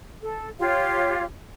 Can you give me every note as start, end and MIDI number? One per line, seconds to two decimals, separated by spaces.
0.21 0.49 69
0.60 1.24 65
0.60 1.24 67
0.60 1.24 73
0.60 1.24 77